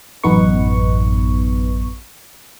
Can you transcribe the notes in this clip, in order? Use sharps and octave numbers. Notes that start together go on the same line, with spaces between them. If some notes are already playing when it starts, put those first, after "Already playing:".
A1 F#2 B3 D#4 B4 C#6